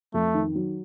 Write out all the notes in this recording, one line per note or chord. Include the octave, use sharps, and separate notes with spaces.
F2 A3
D#3
F#3